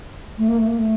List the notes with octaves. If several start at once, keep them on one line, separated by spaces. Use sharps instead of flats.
A3
A#3
A3
A#3
A3